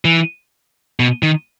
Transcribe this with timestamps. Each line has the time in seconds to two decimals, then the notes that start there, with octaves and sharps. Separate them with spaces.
0.05 E3
1.00 B2
1.23 D#3